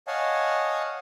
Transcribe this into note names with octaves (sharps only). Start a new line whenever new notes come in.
C#5 D#5 F5 F#5 G#5 A5